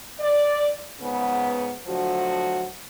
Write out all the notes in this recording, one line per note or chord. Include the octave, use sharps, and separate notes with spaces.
D5
G#2 C#3 B3
D3 F3 F#3 A3 F#4